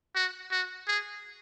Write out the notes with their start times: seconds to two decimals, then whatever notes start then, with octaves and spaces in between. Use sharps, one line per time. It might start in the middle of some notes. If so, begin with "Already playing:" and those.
0.15 F#4
0.51 F#4
0.88 G#4